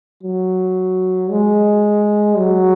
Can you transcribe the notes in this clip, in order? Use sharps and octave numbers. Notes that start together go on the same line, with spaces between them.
F#3
G#3
F#3